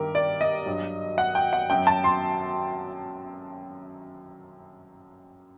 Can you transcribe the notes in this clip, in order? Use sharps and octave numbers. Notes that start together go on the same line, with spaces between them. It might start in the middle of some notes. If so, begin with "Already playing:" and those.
Already playing: G2 D#3 G3 G4 A#4
D5
D#5
G2 F#3
F#5
G5
F#5
F#2 F#3 G5
A5
C6